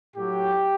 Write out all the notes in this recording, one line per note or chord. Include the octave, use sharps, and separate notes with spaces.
A2 F#3 G4